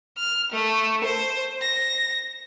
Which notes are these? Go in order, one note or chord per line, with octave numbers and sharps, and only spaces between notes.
F6
A3
C5
A#6